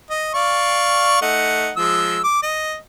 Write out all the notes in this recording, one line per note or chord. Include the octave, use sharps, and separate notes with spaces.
D#5
D5 F5 C#6
A3 D#4 F#5
F3 G#3 E6
D6
D#5